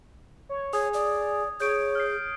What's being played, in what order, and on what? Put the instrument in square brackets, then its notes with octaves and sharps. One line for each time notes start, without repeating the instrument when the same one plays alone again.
[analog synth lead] C#5
[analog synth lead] G#4 [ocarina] C#5 [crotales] D#6 G#6
[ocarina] D5
[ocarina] G#4 [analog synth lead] C#5 [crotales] G6 D7
[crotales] F6 C7